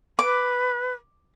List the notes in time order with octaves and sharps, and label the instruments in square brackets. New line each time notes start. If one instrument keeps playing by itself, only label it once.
[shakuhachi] B4 [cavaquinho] D6